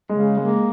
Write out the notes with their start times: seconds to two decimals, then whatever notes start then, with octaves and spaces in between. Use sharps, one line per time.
0.09 C#3 G#3
0.37 G#3 A#3